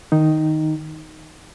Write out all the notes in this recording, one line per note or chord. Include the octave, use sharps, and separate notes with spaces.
D#3 D#4